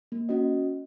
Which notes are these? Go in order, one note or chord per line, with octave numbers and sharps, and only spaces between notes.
A#3
C#4 F#4 D#5